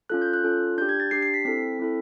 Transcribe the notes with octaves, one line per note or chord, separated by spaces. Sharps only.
C#4 F4 A4 F#6
G6
F#6
C#4 F4 A4
D4 G4 G6
G#6
A6
D4 G4 C7
C7
B6
C4 E4 A4 B6
C4 E4 A4